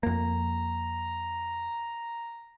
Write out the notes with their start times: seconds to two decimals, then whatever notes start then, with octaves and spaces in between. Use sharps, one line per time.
0.03 F2 A#3 A#5